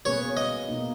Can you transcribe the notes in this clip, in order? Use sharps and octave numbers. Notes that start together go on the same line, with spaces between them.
B2 A#3 C#4 G#4 B4 C#5
D#5
B2 A#3 D#4